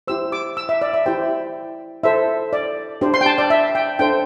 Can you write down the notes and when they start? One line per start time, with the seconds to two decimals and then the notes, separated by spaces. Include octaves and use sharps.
0.08 E4 G4 C5 E6
0.32 D6
0.57 E6
0.69 E5
0.82 D5
0.93 E5
1.06 E4 G4 C5 G5
2.03 E4 A4 C5 E5
2.53 D5
3.01 D4 G4 C5
3.14 C6
3.21 G5
3.26 A5
3.38 D5
3.50 E5
3.75 G5
3.99 D4 A4 C5 G5